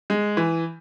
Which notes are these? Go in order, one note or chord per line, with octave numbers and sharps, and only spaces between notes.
G#3
E3